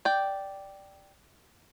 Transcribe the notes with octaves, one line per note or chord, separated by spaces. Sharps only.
D5 G5